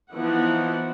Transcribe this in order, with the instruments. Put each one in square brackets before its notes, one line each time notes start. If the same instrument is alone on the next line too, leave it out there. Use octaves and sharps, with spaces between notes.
[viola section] E3 F3 B3 D#4 E4 F#5